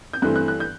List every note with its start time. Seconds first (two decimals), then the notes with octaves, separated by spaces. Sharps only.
0.13 G6
0.22 G2 E3 A3 C4 F#6
0.36 F#6
0.48 F#6
0.60 G6